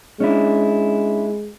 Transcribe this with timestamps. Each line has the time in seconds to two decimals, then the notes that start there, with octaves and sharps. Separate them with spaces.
0.20 G#3 C#4 D4 E4